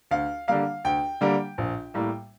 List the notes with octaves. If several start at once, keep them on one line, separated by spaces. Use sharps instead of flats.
D2 F5
D3 G3 A#3 F5
D2 G5
D3 G3 A#3
A#1
A2 G3 A#3